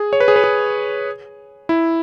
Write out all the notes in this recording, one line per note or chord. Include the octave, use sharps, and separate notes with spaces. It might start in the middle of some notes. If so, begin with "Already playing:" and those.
Already playing: G#4
C#5
B4
G#4
B4
G#4
E4